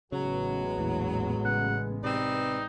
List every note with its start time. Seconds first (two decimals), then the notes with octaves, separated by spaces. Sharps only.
0.12 A1 C#3 F#3 G#3 B3
0.78 E2 A#2 E3
1.45 C#3 F#5
2.04 C3 C4 D#4 B4 D5